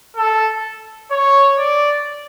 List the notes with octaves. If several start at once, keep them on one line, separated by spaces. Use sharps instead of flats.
A4
C#5
D5